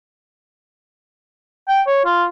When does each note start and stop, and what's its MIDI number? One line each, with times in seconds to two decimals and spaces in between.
1.68 1.81 79
1.87 2.04 73
2.05 2.25 65